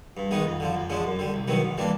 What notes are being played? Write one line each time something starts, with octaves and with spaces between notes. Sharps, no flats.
G2
D#3 G#3 B3 D#4
F2
D3 F3
F2
D3 F3 G#3 C#4
F#2
D3 G3
C2
C3 D#3 F#3 B3
G#2
E3 G3 A#3 D4